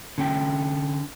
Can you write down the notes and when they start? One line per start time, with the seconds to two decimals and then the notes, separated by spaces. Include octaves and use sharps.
0.18 D3 C#4 G5